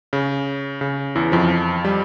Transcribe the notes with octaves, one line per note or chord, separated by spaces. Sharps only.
C#3
C#3
E2 E3
F2 F3
G3